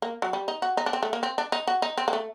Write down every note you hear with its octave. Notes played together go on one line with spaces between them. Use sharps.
A#3
F#3
G3
D#4
F#4
D#4
D4
C4
A3
A#3
C4
D4
D#4
F#4
D#4
C4
A#3
A3